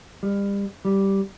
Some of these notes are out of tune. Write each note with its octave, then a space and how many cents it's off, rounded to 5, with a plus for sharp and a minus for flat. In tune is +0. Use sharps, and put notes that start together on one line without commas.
G3 +35
G3 -5